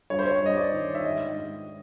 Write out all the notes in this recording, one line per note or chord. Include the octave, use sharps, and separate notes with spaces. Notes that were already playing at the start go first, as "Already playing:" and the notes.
G2 C#5
C5
C#5
G2 D#5
D5
D#3
E5
G#2 D#5
G#2